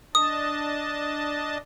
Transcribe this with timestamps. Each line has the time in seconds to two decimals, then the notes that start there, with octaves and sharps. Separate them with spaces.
0.15 D4 D#5 A5 D#6